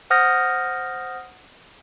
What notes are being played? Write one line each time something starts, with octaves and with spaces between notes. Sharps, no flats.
C5 F#5 D#6 F6 G6 A#6